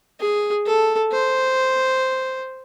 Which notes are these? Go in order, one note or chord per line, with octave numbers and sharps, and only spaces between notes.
G#4
A4
C5